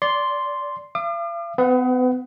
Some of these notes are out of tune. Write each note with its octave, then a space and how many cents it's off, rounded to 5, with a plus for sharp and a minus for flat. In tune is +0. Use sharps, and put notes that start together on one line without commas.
D5 -20 C6 +0
F5 -45 D6 +40
B3 +40 B4 +30 F#5 -25